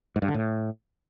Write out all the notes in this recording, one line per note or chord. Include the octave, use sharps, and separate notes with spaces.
G#2
G2
D3
A2